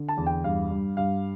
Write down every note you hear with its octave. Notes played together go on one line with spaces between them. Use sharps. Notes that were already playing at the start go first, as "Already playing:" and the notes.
Already playing: D3
A5
E2
G5
G2 F5
G2
G2 F5